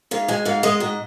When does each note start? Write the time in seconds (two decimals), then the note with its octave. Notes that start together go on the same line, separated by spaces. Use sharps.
0.11 G#2 F5
0.28 G#3 G#5
0.45 G#2 F5
0.63 G#3 D#5
0.80 G#2 D#5